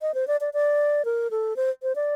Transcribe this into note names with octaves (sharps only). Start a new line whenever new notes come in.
D#5
C5
D5
D5
D5
A#4
A4
C5
C5
D5